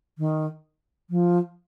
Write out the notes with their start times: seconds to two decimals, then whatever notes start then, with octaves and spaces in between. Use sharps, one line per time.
0.18 D#3
1.10 F3